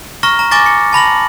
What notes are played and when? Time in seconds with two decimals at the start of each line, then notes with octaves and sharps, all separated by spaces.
0.23 A#5 C#6 F6 A#6
0.39 A#5
0.51 G#5 A#5 C#6 D6 A6 A#6
0.66 C#7
0.93 A5 B5 A#6 F#7